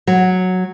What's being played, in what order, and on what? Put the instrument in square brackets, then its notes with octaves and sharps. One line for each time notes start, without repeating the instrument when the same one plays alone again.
[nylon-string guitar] F#3